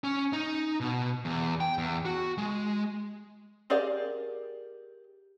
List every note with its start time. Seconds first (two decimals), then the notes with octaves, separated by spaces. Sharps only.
0.04 C#4
0.33 D#4
0.80 B2
1.25 E2
1.60 G5
1.78 E2
2.05 F#4
2.38 G#3
3.70 G4 G#4 A#4 D5 F5